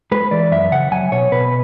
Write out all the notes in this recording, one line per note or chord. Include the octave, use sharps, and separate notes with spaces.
G#3 B4
E3 D5
F#2 E5
C#3 F#5
F#3 G#5
B2 C#5
B2 B4